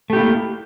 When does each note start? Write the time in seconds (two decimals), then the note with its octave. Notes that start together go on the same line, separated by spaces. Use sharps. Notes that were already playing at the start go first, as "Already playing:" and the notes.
0.10 A3
0.13 G4
0.16 E4
0.20 A#3